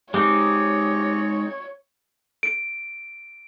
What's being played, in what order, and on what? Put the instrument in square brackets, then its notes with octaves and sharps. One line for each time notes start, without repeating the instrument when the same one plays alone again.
[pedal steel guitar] G#3 C4 D#4 [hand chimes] G4 D6 [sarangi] C#5
[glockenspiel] D7